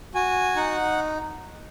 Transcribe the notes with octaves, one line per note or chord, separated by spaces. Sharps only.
F#4 G#5
D#4 F#5